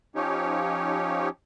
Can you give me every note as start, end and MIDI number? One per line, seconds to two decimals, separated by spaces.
0.15 1.29 53
0.15 1.29 61
0.15 1.29 63
0.15 1.29 67
0.15 1.29 73